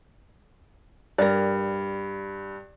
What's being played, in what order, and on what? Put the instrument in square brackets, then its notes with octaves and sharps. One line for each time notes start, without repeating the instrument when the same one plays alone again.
[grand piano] G2 [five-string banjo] A#4 D5